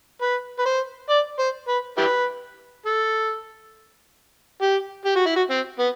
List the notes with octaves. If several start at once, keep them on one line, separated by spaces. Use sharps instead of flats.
B4
B4
C5
D5
C5
B4
E4 G4 B4
A4
G4
G4
F#4
E4
F#4
C4
B3